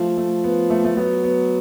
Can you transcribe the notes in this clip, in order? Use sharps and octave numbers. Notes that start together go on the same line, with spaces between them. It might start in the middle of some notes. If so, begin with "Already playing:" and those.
Already playing: F3 A3
A3
B3
A3
A3
F#3 B3
B3